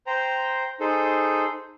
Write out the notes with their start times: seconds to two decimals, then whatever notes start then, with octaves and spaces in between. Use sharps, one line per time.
0.07 C5 G5 A#5
0.80 D#4 G#4 A4 C5